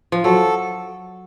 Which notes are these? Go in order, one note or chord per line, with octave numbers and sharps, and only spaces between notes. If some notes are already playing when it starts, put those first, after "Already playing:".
F3
F#3 A4